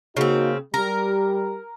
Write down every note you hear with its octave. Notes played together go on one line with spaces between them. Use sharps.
C#3 A#3 C4 D#4 F#4
G3 G4 A#4